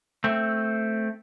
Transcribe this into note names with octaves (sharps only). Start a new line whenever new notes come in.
A3 C4